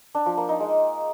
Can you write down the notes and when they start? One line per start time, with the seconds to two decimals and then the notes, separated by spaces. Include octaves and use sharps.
0.15 D4
0.26 F3
0.37 A#3
0.49 D#4
0.60 G#3